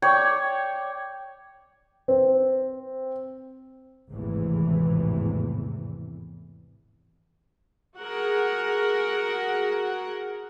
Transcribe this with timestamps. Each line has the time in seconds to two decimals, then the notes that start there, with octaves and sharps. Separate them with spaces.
0.02 C#5 D5 G5
2.08 C4
4.10 G#1 E2 A2 C3 E3
7.98 F#4 G#4 A#4 F#5